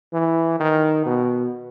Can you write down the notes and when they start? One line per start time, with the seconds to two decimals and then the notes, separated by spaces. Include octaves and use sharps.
0.13 E3
0.60 D#3
1.06 B2